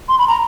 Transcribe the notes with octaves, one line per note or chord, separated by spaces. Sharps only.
C6
B5
A#5